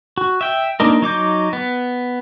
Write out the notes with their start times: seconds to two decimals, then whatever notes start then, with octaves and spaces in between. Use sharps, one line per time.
0.18 F#4
0.41 E5 G5
0.80 A#3 C4 D4 D#4 A#4
1.02 F#3 D#4 D6 G6
1.53 B3